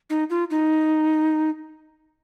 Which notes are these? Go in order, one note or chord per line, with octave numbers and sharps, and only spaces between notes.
D#4
F4
D#4